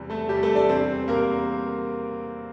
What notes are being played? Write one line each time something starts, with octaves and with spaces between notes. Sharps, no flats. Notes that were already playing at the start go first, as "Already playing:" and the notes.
Already playing: E2 C3 G3
A3 A4
E2 C3 G3 G4
A3 A4
D4 D5
E2 C3 G3 C4 C5
E2 C3 G3 A#3 A#4